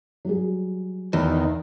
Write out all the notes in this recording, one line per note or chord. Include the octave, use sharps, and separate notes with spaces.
F#3 G3 G#4
E2 D#3